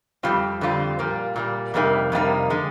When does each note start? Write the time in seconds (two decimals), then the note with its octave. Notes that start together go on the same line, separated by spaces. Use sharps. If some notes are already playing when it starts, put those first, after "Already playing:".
0.23 F2 D3 G3 C4 F4
0.61 F2 D3 G3 C4 F4
0.99 A#2 G3 A#3
1.36 A#2 G3 A#3
1.74 F2 C3 G3 A#3 D#4
2.12 F2 C3 G3 A#3 D#4
2.50 D3 G#3